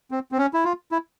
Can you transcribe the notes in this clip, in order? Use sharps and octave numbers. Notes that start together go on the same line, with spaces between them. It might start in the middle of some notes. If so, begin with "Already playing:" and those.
C4
C4
C#4
E4
F4
E4